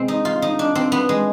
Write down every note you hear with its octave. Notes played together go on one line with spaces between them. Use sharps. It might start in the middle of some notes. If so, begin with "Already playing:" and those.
Already playing: C3 G#3 C4
D#4
F4
D#4
D4
C4
B3
G#3